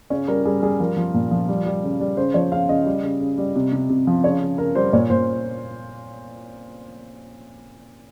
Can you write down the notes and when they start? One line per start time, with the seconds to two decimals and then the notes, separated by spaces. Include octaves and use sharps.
0.10 C#3 C#4
0.28 G3 A#4
0.45 G3 G#4
0.62 G3 G#4
0.80 F3 A#4
0.97 F3
1.14 A#2
1.31 F3
1.49 G3
1.66 G3
1.84 C#3
2.00 G3
2.17 C#3 C5
2.34 F3 C#5
2.52 C#3 F5
2.69 C#3 D#5
2.86 G3
3.03 C#3
3.20 C#3
3.38 G3
3.56 C3
3.72 C3
3.89 C3
4.07 F3
4.24 C#3 C#5
4.42 C#3
4.58 C#3 A#4
4.75 G3 C5
4.93 A#2 C#5
5.10 A#2 C5